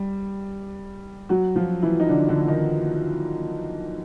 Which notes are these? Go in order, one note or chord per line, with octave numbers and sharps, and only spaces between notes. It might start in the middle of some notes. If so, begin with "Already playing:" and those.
Already playing: G3
F#3 F#4
F3 F4
E3 E4
D#4
D3 D4
D3 D4
D#3 D#4